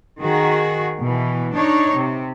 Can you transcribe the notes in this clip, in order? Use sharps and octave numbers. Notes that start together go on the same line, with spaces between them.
D#3 F#4 G#4
B2 E3
D4 D#4 C#5
C3